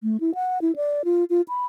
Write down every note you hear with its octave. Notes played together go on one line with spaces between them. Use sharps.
A3
E4
F#5
E4
D5
F4
F4
B5